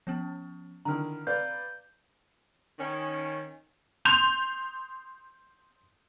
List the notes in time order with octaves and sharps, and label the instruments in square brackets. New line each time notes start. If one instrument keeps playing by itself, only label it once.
[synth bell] F3 B3 C#4
[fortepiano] D3 D#3 E4 [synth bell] A#5 F6
[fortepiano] B4 D5 F5 [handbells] G6
[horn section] D#3 C#4
[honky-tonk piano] C6 G6 F7